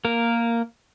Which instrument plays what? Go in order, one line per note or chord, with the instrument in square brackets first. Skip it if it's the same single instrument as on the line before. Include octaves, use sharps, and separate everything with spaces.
[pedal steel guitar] A#3 A#4